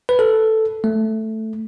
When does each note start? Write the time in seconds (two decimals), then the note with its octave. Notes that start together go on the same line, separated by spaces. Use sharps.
0.09 B4
0.19 A4
0.84 A3